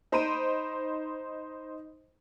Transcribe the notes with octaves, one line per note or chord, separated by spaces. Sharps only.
D#4 C5 A#5 B5 D7 D#7